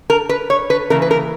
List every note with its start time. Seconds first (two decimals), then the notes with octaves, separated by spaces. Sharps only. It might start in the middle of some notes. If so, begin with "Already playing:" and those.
0.10 A#4
0.29 B4
0.50 C#5
0.70 B4
0.90 C#3 E3 A#3 A#4
1.02 B4
1.11 A#4